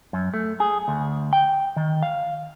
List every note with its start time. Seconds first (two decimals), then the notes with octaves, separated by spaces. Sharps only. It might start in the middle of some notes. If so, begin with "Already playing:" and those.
0.13 F#2
0.34 A3
0.60 G#4
0.88 D2
1.33 G5
1.76 D#3
2.03 F5